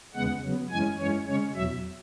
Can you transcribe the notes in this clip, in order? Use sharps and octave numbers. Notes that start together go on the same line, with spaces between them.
E2 C#3 G#3 B3 F#5
C#3 F#3 B3
F#2 E3 G#3 C#4 G#5
F#2 E3 G#3 C#4 C#5
C#3 G#3 C#4 C#5
E2 B2 F#3 E5